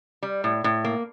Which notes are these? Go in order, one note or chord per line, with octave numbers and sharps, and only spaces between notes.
G3
A2
A2
A#3